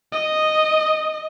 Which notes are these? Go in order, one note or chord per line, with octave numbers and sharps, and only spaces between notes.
D#5